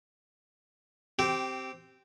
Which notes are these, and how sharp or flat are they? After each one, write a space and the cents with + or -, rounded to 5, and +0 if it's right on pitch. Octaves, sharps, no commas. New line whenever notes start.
C4 +0 G4 -15